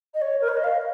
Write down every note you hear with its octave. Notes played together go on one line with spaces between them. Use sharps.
D#5
C#5
A#4
C#5
D#5
F5